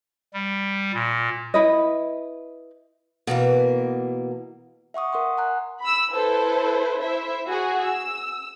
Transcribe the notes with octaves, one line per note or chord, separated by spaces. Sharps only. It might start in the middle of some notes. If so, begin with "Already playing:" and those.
G3
A#2
E4 B4 D#5
B2 E3 A#3 A#4
E5 F#5 C#6 D#6
A#4 F#5 C6
F#5 G#5 A#5 F#6
B5 E6
E4 A4 B4 C5
E4 C5 E5
F#4 G#4
E6